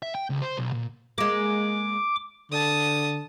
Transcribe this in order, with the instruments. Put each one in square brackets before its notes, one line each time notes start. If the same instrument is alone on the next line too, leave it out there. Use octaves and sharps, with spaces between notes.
[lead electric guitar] E5
G5
C#2
C5
B1
A#2
[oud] G#3 A#3 [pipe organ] D6
[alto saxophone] D3 [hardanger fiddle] A5 D#6